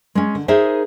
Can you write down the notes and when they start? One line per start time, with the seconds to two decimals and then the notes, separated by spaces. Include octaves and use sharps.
0.15 G#3 C#4
0.35 D3
0.48 D#4 G#4 A#4 C5 E5